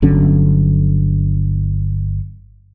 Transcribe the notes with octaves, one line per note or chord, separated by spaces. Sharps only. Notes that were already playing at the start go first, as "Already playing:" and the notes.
G1 D3 F#3 C#4